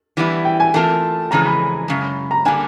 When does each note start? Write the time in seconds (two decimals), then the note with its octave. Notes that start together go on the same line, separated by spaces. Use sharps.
0.17 E3 G3 B3 E4
0.45 G5
0.60 G#5
0.74 E3 A3 C4 F4 A#4 A5
1.31 F2 C#3 E3 G#3 A#5
1.45 B5
1.88 F#2 C#3 G#3
2.31 A#5
2.45 D3 G3 A#3 D4 G#5